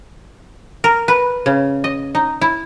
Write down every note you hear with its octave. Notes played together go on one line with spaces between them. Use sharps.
A#4
B4
C#3
D#5
D#4
E4